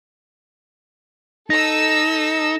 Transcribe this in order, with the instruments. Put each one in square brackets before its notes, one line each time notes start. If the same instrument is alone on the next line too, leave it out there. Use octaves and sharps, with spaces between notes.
[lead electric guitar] D#4 [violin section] A4 E6 [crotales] A#6